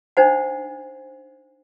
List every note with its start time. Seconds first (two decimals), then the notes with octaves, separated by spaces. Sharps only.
0.17 D4 D#4 C5 F#5